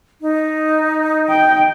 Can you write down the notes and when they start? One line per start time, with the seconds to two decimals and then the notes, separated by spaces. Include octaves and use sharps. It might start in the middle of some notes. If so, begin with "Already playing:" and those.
0.21 D#4
1.30 G5